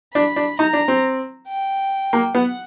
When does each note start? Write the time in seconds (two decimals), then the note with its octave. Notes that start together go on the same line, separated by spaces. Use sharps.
0.14 D4 B5
0.36 D4
0.59 D#4 A#5
0.73 D4
0.88 C4
1.47 G5
2.13 A#3
2.35 B3 F#5